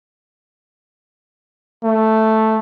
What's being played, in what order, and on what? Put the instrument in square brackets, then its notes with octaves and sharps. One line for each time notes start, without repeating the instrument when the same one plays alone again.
[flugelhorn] A3